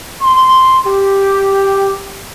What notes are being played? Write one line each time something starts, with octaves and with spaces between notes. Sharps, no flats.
C6
G4